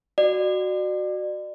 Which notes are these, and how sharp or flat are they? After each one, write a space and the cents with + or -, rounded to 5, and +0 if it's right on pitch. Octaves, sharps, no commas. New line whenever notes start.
F#4 +0 D5 +35